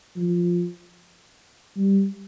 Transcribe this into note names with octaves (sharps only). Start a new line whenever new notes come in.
F3
G3